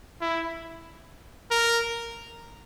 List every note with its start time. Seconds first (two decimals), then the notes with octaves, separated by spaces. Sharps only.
0.21 E4
1.51 A#4